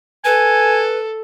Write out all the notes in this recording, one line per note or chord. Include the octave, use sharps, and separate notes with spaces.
A4 B4 G#5